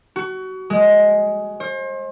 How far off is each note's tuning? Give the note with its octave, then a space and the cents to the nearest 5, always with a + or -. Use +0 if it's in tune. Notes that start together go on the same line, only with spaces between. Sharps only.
F#4 +25
G#3 +5
C5 +35